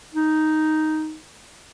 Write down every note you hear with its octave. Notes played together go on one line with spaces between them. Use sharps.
D#4